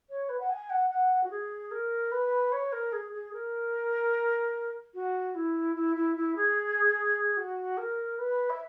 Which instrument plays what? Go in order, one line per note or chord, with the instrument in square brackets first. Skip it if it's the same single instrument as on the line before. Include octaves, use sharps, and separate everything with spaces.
[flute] C#5
B4
F#5
G#5
F#5
F#5
F#4
G#4
A#4
B4
C#5
A#4
G#4
G#4
A#4
F#4
E4
E4
E4
E4
G#4
F#4
A#4
B4
E5